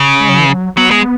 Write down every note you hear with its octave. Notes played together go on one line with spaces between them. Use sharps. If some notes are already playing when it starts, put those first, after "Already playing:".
Already playing: C#3
G#3
F#3
E3
F#3
F#3 B3
G#3